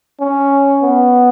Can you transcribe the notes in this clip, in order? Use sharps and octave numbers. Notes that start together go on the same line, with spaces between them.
C#4
B3